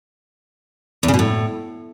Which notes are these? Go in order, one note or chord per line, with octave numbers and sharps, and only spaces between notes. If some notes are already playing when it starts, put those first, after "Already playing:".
E2
C#3
B2
A2